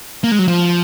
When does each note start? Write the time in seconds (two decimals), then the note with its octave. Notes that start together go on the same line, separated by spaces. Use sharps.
0.24 A#3
0.31 G#3
0.39 F#3
0.48 F3